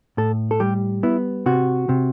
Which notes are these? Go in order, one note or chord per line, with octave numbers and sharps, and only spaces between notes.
A2 A4
A4
G3 G4
B3 E4
C3 F#4
C3